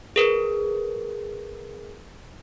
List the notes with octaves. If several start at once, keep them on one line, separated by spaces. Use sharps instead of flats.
G#4 A#4 B4